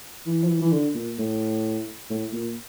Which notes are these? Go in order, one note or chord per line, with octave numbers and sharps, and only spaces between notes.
E3
F3
E3
E3
D3
A#2
A2
A2
A#2